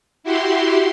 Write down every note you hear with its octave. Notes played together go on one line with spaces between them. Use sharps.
E4 F#4 G4 C6